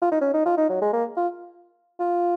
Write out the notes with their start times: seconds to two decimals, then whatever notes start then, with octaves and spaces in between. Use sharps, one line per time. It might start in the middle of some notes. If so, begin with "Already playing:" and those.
0.02 F4
0.11 D#4
0.21 C#4
0.34 D#4
0.46 F4
0.57 D#4
0.69 F#3
0.82 G#3
0.93 A#3
1.17 F4
2.00 F4